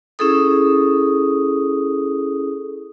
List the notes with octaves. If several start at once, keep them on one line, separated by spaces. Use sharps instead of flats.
C#4 E4 G#4 A4 D#6